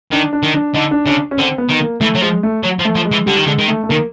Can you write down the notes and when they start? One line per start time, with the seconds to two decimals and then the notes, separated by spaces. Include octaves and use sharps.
0.12 D#3 D4
0.33 D4
0.43 D#3
0.54 D4
0.74 D3 D#4
0.91 D4
1.06 C#3 D4
1.31 C#4
1.38 D3 C4
1.58 B3
1.69 D#3
1.80 A#3
2.01 E3 A3
2.15 F#3
2.21 F3 G#3
2.43 A3
2.64 F#3
2.80 F3
2.85 A3
2.95 F3
3.05 G#3
3.11 E3
3.26 D3 G3
3.36 D#3
3.46 D3 G#3
3.59 D#3
3.68 A3
3.84 A3
3.89 D#3 A#3